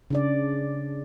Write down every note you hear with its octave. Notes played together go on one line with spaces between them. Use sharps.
C#3 D4 D5